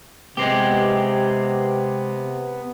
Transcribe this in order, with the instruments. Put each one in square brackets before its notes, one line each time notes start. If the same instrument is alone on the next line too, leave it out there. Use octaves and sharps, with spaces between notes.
[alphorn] C3 [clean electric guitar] G#3 C4 G4 [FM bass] B3